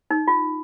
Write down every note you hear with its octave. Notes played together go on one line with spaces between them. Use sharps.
D#4
F4